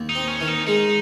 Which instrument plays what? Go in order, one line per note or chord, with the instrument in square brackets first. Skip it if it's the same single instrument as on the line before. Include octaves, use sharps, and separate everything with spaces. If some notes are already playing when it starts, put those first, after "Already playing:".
Already playing: [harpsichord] D#2
[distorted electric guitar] D#4
[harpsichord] C4
[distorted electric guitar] C#4
[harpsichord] D#3
[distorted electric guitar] D#4
[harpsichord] G#3 [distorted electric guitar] D#4